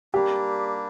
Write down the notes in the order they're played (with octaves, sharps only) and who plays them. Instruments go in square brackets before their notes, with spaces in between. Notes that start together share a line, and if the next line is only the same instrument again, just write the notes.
[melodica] G3 A#3 D4 [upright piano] G4